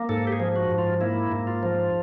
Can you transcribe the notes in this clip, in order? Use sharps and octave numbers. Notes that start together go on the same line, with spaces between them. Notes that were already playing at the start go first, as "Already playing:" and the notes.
Already playing: A#3
G#2 A4
G4
G#4
F3
F#4
G#2
F4
A#3 E4
G#2
F4
F3